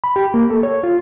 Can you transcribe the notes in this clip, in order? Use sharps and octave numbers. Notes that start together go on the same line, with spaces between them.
B5
G4
A#3
A4
C#5
F4